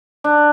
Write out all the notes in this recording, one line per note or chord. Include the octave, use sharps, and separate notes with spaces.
D4